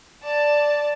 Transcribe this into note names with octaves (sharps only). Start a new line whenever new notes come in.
D5 A5